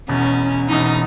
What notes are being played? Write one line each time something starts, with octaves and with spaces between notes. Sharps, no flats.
E1 E2 B2 C#4
E1 E2 B2 D#4